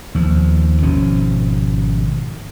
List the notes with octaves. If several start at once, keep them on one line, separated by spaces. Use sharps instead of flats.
D#2 F3
G#1 B2 F3 C#4